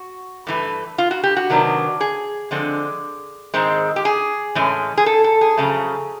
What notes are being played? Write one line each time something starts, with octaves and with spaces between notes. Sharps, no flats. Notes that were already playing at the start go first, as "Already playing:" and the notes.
Already playing: F#4
G2 E3 A3
F4
F#4
G4
F#4
C3 D#3 F#3 B3 D4
G#4
D3 F3 G#3 C4
G#2 D#3 G#3 C4
G4
G#4
A2 E3 G#3 C#4
G#4
A4
A4
G#4
F2 C#3 F#3 A3